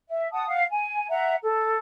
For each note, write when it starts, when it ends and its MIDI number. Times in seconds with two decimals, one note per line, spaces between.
0.08 0.27 76
0.32 0.47 78
0.32 0.47 81
0.32 0.47 87
0.48 0.63 77
0.48 0.63 78
0.69 1.08 80
1.09 1.34 76
1.09 1.34 78
1.09 1.34 82
1.43 1.78 69